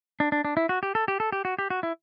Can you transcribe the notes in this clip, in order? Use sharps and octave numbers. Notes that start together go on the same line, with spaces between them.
D4
D4
D4
E4
F#4
G4
A4
G4
A4
G4
F#4
G4
F#4
E4